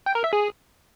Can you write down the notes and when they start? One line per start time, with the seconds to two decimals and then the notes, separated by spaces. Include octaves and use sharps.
0.06 G5
0.15 A#4
0.24 E5
0.33 G#4